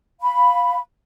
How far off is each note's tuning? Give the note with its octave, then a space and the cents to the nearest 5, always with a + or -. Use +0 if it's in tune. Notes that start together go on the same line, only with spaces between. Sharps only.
F5 +10 B5 +0